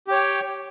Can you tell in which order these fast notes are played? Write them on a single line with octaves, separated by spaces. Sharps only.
G4 C#5 G5